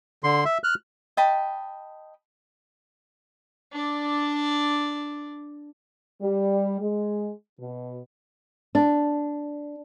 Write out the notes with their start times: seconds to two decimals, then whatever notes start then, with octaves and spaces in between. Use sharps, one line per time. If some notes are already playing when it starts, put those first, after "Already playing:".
0.24 D3 C6
0.45 E5
0.64 F6 F#6
1.17 D#5 G5 A5 B5
3.72 D4 D5
6.22 G3
6.79 G#3
7.59 B2
8.75 D4